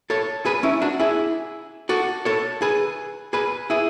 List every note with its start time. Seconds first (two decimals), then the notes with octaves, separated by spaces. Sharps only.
0.10 A4 C#5
0.45 G#4 B4
0.63 C#4 E4
0.82 D4 F#4
1.00 E4 G#4
1.89 F#4 A4
2.25 A4 C#5
2.62 G#4 B4
3.33 G#4 B4
3.70 E4 G#4